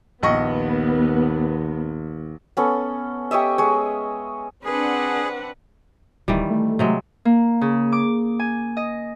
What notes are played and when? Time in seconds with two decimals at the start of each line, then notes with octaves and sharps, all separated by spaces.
0.23 A#1 D#2 B3 D#5 C#6
2.57 B3 C#4 A4
3.31 G4 C#5 D#5 E5
3.58 G#3 C#5
4.65 C4 D4 G#4 B4 F#5
6.28 D1 D#3 E3 G3
6.50 A3
6.79 C3 F#3 G#3
7.25 A#3
7.61 C#3
7.92 D6
8.39 G#5
8.77 D#5